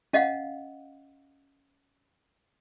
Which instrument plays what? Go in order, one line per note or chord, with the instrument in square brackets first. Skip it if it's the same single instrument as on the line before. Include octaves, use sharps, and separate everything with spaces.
[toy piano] C#4 D#5 F5 F#5